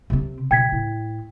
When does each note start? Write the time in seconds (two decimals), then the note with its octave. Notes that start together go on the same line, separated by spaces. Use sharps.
0.10 C3 C4
0.51 B2 G5 G#6 B6
0.72 A2